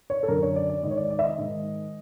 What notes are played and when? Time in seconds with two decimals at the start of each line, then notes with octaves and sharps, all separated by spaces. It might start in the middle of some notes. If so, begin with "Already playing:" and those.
0.10 C#5
0.23 A4
0.28 F#2 D3 A#4
0.43 C#5
0.56 D5
0.69 D5
0.83 G#2 D#3 D#5
0.91 C#5
0.97 D5
1.10 D5
1.19 E5
1.24 D#5
1.38 G#2 D#3